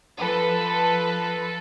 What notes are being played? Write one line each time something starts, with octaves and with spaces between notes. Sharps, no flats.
F3 A4 B4